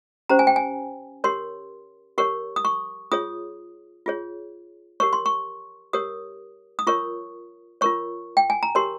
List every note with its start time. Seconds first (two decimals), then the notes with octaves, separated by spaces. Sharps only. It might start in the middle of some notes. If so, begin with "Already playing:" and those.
0.29 C#4 G4 C5 A#5
0.39 G#5
0.47 G5
0.56 G#5
1.24 G4 A#4 C#5 C6
2.18 G4 A#4 C#5 C#6
2.56 D#6
2.65 C#6
3.12 F4 G#4 C#5 D#6
4.06 F4 G#4 C#5
5.00 G4 A#4 C#5 C#6
5.13 C6
5.26 C#6
5.93 G4 A#4 C#5 D#6
6.79 D#6
6.87 F4 A#4 C#5 C#6
7.81 F4 A#4 C#5 C#6
8.37 G5
8.50 G#5
8.63 A#5
8.75 G4 A#4 C#5 C6